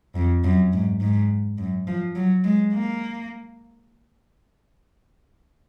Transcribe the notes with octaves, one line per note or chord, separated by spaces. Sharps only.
F2
F#2
G#2
G#2
F#2
F3
F#3
G#3
A#3